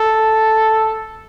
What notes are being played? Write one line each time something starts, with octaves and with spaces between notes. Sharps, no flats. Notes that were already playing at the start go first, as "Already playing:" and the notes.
Already playing: A4